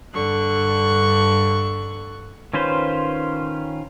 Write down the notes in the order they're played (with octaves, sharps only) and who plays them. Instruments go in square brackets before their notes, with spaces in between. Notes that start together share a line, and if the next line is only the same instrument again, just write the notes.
[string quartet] G2 D3 C#6 F#6
[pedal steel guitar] D#3 C#4 F4 B4 C5